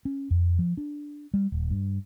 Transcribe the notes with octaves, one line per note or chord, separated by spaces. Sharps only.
C#4
F2
F3
D4
G3
D#1
G2